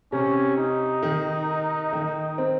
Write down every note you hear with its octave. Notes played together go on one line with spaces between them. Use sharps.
C3 C#4
D#4
D#3
D#3
C4